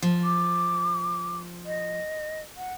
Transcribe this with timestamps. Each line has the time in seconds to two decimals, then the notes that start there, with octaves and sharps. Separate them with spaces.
0.02 F3
0.24 D6
1.66 D#5
2.57 F#5